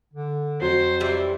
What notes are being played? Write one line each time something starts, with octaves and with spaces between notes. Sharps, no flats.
D3
F2 F#3 C5
C3 E3 G3